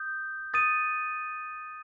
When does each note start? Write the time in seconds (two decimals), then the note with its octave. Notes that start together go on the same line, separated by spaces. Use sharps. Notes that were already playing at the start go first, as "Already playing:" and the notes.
Already playing: D#6 G6
0.54 D#6 A6 D#7